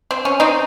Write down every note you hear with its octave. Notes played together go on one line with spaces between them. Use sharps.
C4
C#4
C4 D#4